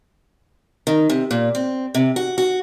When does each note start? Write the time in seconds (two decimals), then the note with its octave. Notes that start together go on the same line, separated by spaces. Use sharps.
0.87 D#3
1.10 C3
1.31 A#2
1.55 C4
1.94 C3
2.16 F#4
2.38 F#4